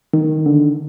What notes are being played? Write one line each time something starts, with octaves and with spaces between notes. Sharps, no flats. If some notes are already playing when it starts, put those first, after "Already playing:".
D#3
D3